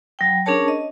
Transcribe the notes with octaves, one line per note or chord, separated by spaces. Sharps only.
F#3 G5
C#4 D4 G#4 A#4 C#5 A5
D#5